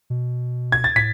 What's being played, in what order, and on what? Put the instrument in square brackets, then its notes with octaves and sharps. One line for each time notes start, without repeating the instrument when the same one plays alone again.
[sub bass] B2
[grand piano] G#6
A6
[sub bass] A2 [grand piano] B6